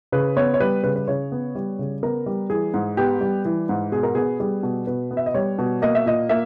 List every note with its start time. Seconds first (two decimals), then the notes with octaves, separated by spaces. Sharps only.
0.12 C#3 B4
0.37 B3 C#5
0.54 C#5
0.60 G3 B4
0.84 C#3 B4
0.96 B4
1.07 C#3 C#5
1.32 B3
1.55 G3
1.79 C#3
2.03 B3 A#4
2.26 G3
2.50 E3 G#4
2.74 G#2
2.97 B3 G4
3.21 G3
3.45 E3
3.69 G#2
3.92 B2 G#4
4.03 A#4
4.15 B3 G#4
4.40 G3 G#4
4.63 B2
4.87 B2 B4
5.11 B3
5.17 E5
5.26 D#5
5.34 G3 C#5
5.58 B2
5.82 A#3 D#5
5.95 E5
6.06 A#2 D#5
6.29 A#3 E5